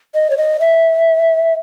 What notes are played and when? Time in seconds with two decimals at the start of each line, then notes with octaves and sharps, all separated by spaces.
0.15 D#5
0.30 C#5
0.38 D#5
0.60 E5